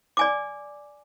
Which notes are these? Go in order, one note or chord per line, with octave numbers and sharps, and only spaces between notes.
D5 G#5 D6